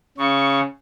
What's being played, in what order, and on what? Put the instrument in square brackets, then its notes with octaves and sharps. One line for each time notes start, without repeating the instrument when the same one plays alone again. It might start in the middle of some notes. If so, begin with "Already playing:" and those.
[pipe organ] C#3 [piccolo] C#6